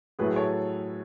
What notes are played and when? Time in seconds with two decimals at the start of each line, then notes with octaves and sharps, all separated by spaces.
0.19 A2 F#3 A3 G#4 B4
0.36 A4 C#5